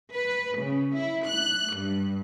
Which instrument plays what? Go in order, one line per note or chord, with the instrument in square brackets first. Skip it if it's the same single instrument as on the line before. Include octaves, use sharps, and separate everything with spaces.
[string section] B4
C#3
E4
F#6
G2